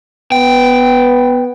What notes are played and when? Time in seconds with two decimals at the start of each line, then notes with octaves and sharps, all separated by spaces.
0.32 B3 G5